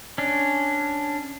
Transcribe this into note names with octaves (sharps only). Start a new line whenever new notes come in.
C#4 D4